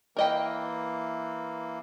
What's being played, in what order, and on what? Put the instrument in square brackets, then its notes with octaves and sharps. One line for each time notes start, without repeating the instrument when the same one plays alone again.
[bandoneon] E3 A#3 [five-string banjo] A#4 D#5 G5